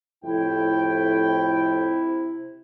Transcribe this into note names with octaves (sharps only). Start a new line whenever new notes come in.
F2 A2 C3 E4 G5